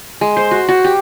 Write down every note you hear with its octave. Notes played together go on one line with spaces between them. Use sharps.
G#3
C5
F#4
F#4
G4